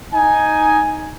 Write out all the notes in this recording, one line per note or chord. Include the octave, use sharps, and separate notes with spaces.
D#4 G#5